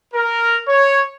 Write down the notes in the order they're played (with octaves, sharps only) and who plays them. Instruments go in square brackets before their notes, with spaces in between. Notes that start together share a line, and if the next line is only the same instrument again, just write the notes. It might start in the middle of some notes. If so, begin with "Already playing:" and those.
[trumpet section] A#4
C#5